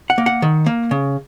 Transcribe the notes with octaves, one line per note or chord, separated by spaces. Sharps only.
F#5
A#3
F#5
D#3
A#3
C#3